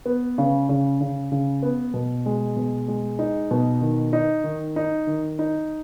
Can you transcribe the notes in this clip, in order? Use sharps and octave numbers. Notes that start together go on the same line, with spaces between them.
B3
C#3
C#3
C#3
C#3
B3
B2
G#3
B2
G#3
D#4
B2
D#3
D#4
D#3
D#4
D#3
D#4